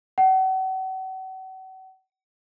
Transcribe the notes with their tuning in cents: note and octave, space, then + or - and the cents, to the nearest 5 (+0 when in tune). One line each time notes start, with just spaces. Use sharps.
F#5 +40